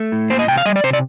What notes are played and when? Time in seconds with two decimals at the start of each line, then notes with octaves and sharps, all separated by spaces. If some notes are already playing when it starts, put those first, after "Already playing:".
Already playing: A3
0.12 A2
0.30 A#3 C5
0.39 D#5
0.48 C3 G5
0.57 F5
0.65 G3 D#5
0.76 D5
0.84 C3 C5
0.93 D5